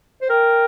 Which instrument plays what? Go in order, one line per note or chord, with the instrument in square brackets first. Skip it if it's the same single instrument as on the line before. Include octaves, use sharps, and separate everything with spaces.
[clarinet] C5
[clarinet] A#4 [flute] G5